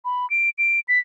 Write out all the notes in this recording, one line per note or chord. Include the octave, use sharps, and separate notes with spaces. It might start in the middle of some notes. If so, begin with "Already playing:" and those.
B5
D7
D7
B6